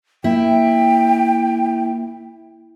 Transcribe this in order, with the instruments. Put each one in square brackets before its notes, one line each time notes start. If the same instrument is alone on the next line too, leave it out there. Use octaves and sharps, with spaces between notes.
[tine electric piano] A#3 [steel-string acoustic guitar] E4 [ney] G5